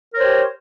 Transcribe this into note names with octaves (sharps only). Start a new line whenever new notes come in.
G4 A#4 C5 C#5